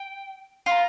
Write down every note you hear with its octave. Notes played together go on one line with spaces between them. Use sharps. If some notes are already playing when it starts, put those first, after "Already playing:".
Already playing: G5
F4 A#5 C6